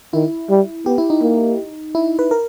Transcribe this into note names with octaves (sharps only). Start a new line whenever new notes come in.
D#3 E4
G3
B3 G4
E4
D#4
A#3
E4
B4
A#4